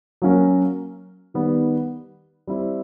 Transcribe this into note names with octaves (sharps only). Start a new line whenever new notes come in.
F#3 A#3 C#4 F#4 A#4
D#3 G3 B3
G3 C4 E4